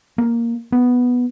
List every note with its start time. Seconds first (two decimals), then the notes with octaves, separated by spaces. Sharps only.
0.18 A#3
0.72 B3